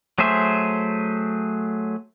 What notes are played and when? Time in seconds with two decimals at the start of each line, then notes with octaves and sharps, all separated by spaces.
0.18 F#3 A3 G#4 C5 E5